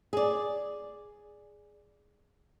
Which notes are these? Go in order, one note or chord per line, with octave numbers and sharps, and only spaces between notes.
G#4 D5